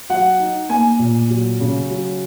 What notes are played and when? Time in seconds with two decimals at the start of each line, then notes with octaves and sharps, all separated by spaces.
0.09 F#3 F#5
0.39 D#4
0.69 A#3 G#5
0.99 A#2
1.30 F#3
1.60 C#3
1.90 F#3